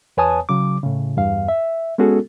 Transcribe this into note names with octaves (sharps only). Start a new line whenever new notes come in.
E2 B4 C#5 G#5 A5 D#6
C#3 F#3 D6
A2 C#3
E2 G2 F5
E5
G#3 B3 C#4 F#4 G#4 A4